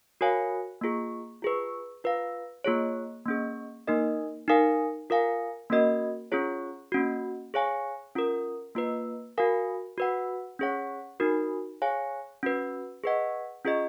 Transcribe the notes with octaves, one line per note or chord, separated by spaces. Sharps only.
F#4 A#4 C#5 F5 G#5
A#3 F4 G#4
F4 G#4 B4
F4 B4 F5
A#3 F4 G#4 C#5
A#3 C#4 G#4
A#3 D#4 A#4 D#5
D#4 A#4 F5 G#5
F4 A#4 F5 G#5
A#3 C#4 F#4 A#4 D#5
C#4 F4 G#4 C#5
A#3 C#4 F#4
G#4 C#5 F5 G#5
C#4 F4 A#4
A#3 F4 B4
F#4 A#4 F5 G#5
F#4 B4 F#5
C#4 G#4 C#5 F#5
D#4 F#4 A#4
G#4 C#5 F5 G#5
C#4 F#4 B4
G#4 B4 D#5 F#5
C#4 F4 G#4 D#5